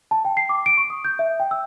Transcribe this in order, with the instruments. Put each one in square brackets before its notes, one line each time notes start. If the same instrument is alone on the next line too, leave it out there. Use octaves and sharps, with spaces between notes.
[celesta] A5
G5
C7
D6
D7
C#6
D#6
G6
E5
G5
E6